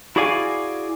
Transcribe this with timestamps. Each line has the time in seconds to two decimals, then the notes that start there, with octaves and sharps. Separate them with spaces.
0.16 E4 F#4 G#4 D5 F5 G#5